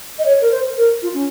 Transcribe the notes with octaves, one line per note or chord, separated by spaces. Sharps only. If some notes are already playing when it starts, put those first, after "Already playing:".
D#5
C#5
A#4
C5
A#4
F4
C#4